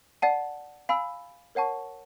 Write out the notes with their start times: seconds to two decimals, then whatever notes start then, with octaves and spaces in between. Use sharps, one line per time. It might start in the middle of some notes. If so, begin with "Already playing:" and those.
0.22 D5 F#5 A5
0.89 F5 G#5 B5 E6
1.55 A#4 C#5 F#5 A5 C#6